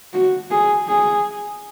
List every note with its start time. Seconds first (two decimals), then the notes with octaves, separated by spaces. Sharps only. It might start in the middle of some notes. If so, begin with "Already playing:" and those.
0.13 F#4
0.51 G#4
0.88 G#4